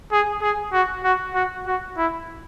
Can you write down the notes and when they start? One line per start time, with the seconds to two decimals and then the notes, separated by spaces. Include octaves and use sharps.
0.12 G#4
0.42 G#4
0.73 F#4
1.04 F#4
1.34 F#4
1.67 F#4
1.97 E4